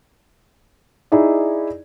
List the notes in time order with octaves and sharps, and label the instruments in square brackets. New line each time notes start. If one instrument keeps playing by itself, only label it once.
[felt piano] D#4 E4 G#4 D5